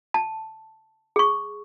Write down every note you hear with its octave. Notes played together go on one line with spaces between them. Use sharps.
A5
G#4 C#6